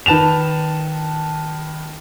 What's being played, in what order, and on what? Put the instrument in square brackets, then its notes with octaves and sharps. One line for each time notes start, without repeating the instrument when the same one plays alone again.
[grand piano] D#3 B4 A5 E7 F7